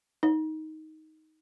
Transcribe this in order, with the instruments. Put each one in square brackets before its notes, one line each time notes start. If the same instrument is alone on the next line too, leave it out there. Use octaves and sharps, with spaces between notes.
[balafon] D#4